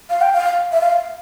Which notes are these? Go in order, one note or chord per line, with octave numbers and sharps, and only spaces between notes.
F5
G5
F5
E5
F5